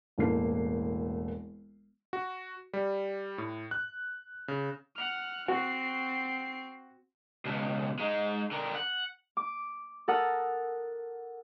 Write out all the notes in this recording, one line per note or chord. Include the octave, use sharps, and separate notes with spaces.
E1 A1 A3 A#3 C7
F#4
G3
A2
F#6
C#3
F#5 F6
C4 F#4 C7
C#2 B2
G#3 D#4
D3 A#4
F#5
D6
A4 A#4 F#5 D#6